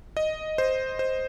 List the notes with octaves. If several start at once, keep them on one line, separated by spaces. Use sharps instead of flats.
D#5
C5
C5